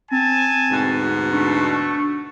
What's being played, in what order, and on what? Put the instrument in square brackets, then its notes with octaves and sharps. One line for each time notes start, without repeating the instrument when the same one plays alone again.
[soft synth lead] C4 [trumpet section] G#5 A5
[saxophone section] D2 G#2 B2
[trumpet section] A3 C#6 [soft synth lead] D4